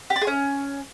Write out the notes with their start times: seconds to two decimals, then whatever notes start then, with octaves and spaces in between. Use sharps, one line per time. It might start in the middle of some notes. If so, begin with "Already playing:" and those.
0.10 G4
0.16 D5
0.21 G#4
0.27 C#4